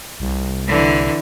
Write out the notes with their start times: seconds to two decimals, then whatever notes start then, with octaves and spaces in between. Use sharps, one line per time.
0.20 C2
0.67 D3 E3